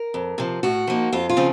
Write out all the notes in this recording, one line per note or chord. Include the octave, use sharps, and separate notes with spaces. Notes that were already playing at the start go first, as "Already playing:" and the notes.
Already playing: A#4
F2
C3 F3
A2 F#4
F3 A#3 D#4
F2 F4
F4
C#3 F3 C4